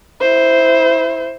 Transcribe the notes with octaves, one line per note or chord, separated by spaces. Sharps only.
E4 C5